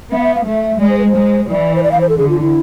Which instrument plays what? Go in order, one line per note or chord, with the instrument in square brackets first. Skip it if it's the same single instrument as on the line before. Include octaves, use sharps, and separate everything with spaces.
[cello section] B3 [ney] E5
[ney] F5
E5
F5
[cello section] A3 [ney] E5
[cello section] G#3 [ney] D5
[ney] C5
B4
C5
[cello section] G#3
[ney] C5
[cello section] E3 [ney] D5
[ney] C5
D5
F5
C5
A4
[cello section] D3 [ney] G#4
[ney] F4
E4